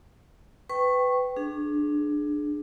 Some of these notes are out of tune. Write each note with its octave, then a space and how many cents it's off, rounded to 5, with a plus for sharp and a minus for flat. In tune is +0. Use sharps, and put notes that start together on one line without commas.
B4 +20 G5 -10 C#6 -15
D4 +15 G#4 +20